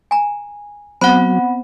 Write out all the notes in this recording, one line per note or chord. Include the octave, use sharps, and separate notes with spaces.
G#5 A#5
F#3 B3 C4 C5 F#5 B5 F#6